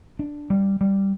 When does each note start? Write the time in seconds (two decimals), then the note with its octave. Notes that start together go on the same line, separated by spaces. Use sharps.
0.19 D4
0.50 G3
0.81 G3